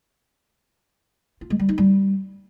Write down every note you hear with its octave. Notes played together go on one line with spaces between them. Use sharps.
F4
G#3
G3
D#4
G3